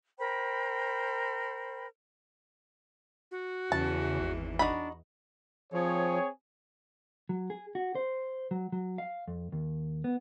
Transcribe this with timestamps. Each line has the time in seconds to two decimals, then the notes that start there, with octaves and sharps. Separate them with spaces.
0.18 A#4 C5 G5 B5
3.31 F#4
3.72 E2 C#3 E3 A5
4.20 G#1
4.59 D4 D#4 F#4 B5
5.73 F3 C4 G#4 C#5
7.29 F#3
7.50 G#4
7.75 F#4
7.95 C5
8.51 F#3
8.72 F#3
8.98 F5
9.28 F2
9.52 D#2
10.04 B3